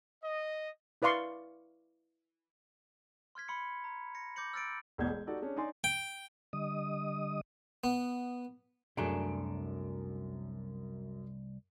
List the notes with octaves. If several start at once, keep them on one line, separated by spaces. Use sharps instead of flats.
D#5
E4 B4 D5 F5 C6 C#6
C6 F6 G#6 B6
B5 C6 C#7
A#5
G#6 A#6 C#7
D6 G6 A#6 C#7 F#7
E6 F6 A6 C#7 D7
E1 A1 E2 B2 G6 G#6
G#3
D#4 F#4 G4 A4 D5
C#4 D4 G#4
D#4 C#5 D5 G#5 C6
G5
D3 G3 D#5 D#6
B3
C2 F#2 A3 D4 G#4 A#5 D7